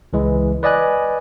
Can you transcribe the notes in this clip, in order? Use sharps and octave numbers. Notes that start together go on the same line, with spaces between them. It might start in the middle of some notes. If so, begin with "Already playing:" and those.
C#2 E3 G#3
B4 D5 D#5 G#5 F#6